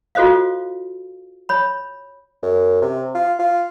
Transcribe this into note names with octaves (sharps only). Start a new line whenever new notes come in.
F4 F#4 A4 C5 D#5 F5
C#5 B5
F#2
C3
F4
F4